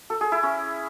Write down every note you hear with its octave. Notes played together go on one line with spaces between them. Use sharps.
A4
G#4
E4
C#4